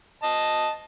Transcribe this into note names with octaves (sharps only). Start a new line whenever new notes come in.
D#5 A5